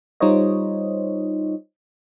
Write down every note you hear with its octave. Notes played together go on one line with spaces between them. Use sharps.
G3 D#4 F4 C5 C#5 D#5